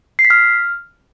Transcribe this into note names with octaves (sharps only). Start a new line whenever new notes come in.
C7
B6
F6